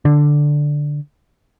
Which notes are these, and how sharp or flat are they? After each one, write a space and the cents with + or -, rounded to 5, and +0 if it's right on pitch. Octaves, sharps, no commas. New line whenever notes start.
D3 +0 D4 +0